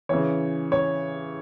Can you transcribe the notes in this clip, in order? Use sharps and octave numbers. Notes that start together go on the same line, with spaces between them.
C#3 E3 C#5
C#5